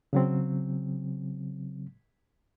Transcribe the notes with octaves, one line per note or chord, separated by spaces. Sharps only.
C#3 F#3 C4